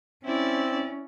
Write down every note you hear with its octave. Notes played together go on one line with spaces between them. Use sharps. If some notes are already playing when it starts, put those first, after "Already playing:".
C4 C#4 E4 D5